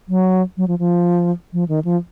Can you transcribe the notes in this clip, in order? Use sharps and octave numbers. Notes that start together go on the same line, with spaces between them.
F#3
F#3
F3
F3
F3
D#3
F3